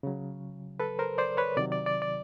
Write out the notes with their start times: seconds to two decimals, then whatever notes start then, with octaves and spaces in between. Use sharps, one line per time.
0.03 C#3 F#3
0.80 A4 B4
0.99 A#4 C5
1.18 C5 D5
1.37 B4 C#5
1.57 C3 D#3 F#3 D5
1.72 D5
1.86 D5
2.02 D5